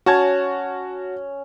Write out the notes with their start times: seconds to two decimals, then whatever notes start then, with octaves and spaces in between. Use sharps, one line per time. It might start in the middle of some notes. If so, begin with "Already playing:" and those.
0.06 C#4 F#4 A5 G#6